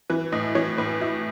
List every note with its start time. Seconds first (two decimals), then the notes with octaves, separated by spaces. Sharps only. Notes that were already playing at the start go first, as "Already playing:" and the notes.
0.10 E3 B4
0.32 A2 D#5
0.55 E3 C#5
0.78 A2 B4
1.01 E4